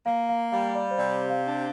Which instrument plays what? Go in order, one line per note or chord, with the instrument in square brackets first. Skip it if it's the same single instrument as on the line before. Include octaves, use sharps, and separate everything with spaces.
[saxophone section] A#3 [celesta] F5
[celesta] F5
[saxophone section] G3 [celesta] F5
[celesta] D5
C5
[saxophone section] C3 [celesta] D5
[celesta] F5
[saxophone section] D4